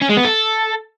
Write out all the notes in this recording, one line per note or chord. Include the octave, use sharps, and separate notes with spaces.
C#4
G#3
B3
A4